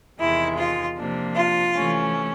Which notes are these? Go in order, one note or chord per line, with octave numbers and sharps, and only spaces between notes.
E2 C3 D#3 G#3 E4
F4
C3 F3 A#3 D4
F4
C3 E3 A3 C#4